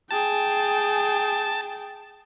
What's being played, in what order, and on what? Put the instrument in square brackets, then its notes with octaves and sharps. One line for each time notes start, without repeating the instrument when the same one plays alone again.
[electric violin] G#4 G5 [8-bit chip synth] A5